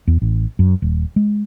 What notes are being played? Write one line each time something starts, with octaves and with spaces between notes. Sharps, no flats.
E2
A1
F#2
D#1
G#3